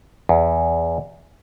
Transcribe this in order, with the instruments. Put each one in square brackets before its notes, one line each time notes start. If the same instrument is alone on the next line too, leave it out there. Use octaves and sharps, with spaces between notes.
[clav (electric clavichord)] E2